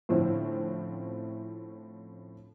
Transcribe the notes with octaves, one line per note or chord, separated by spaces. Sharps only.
A2 D3 F3 C4 C#4 E4